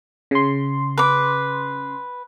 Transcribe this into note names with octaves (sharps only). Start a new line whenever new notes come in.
C#3 C6
B4 D6